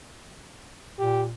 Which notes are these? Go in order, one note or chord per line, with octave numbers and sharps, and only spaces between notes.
A#2 G4